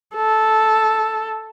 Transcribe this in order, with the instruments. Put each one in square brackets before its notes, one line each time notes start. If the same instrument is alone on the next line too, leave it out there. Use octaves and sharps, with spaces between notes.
[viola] A4